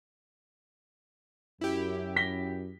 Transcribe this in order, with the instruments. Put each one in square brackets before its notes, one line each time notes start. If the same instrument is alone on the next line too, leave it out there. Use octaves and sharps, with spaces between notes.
[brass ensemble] F#2 [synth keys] E4 G4
[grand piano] A#6 B6 G7